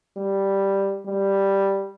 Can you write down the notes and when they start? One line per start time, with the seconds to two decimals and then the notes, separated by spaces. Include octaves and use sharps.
0.17 G3
1.06 G3